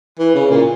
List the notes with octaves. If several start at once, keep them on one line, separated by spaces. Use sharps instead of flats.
E3
C#3
A#2